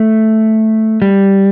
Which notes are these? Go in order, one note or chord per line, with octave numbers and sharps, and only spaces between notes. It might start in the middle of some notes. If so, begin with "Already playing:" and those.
Already playing: A3
G3